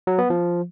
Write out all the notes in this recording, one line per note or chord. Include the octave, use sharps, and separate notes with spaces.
F#3
B3
F3